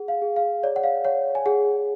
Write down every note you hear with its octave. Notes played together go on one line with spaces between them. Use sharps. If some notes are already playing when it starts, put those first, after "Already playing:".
Already playing: G#4 F#5
F5
G#4
F5
C#5 D5
F#5
F5
C#5 F#5
G#5
G#4 F#5